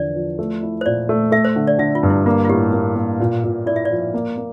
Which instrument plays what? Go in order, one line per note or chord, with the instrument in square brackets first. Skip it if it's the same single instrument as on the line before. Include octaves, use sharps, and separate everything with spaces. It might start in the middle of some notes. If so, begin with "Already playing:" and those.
Already playing: [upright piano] E2 D3 F3 [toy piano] D5
[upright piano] F3
A3
E4
[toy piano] C5
[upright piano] A#2 [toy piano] D5
[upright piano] A3
[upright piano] A3 [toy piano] E5
[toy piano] C5
[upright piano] D3
[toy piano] D5
[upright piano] D3 [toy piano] E5
[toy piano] F4
[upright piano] G2
[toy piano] E4
[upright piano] A#3 [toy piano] F4
[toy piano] F4
[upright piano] A2 [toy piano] G4
[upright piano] A#3
A#3
A#2
A#2
[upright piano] E4 [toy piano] D5
[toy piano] E5
D5
[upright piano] F3
A#3
A#3